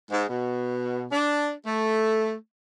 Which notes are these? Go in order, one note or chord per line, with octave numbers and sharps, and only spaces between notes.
G#2
B2
D4
A3